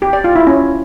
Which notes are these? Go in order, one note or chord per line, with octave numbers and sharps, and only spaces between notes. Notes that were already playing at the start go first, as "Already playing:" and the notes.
G4
D5
F4
E4
C#4